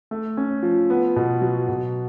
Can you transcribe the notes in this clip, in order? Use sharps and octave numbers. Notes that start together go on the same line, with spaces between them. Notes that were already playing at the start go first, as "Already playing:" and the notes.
A3
C#4
F3
B3
B2
F#3
B2